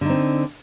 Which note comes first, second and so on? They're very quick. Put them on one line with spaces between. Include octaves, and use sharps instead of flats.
D3 D#4 C4